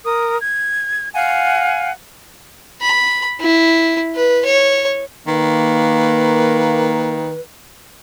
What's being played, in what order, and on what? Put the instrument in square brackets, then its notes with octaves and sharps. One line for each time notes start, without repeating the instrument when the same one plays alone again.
[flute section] A#4 D#6
G#6
F5 F#5 G#5
[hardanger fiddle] B5
E4
B4
C#5
[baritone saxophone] D#3 [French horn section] A#3 [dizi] B4